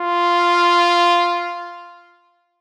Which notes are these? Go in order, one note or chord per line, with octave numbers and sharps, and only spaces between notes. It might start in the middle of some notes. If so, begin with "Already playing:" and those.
Already playing: F4